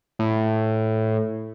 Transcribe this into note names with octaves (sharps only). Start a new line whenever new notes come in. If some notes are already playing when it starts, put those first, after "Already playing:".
A2